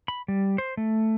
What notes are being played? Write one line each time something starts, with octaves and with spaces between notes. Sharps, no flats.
B5
G3
C5
A3